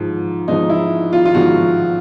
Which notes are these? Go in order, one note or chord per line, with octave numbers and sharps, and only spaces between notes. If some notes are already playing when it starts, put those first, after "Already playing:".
Already playing: G#2 F3
G#2 F3 D#4
E4
F4
F4
G#2 F3 F#4